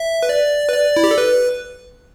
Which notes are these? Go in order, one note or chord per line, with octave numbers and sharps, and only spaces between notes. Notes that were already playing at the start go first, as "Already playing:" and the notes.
Already playing: E5
B4
D5
B4
D5
E4
G4
A4
B4